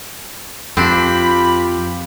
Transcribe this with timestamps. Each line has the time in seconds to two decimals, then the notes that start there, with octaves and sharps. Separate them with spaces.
0.77 F2 F3 C4 D4 F4 G4 B5